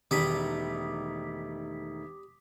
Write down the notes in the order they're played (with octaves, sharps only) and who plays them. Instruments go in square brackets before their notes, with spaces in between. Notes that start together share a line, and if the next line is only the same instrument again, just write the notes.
[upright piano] E1 [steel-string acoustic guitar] D#3 A3 D#4 [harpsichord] G3 [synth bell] D6 D#6 B6